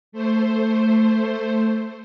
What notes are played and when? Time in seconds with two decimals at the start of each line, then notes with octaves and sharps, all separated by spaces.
0.12 A3 C5